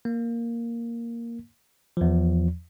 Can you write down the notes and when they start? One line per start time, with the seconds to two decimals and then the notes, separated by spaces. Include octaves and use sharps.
0.05 A#3
1.97 E2 F3